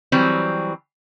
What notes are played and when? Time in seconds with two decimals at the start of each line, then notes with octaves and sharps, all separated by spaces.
0.12 E3 F#3 G3 C4